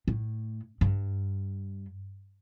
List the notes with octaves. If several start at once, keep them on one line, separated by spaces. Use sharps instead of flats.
A2
G2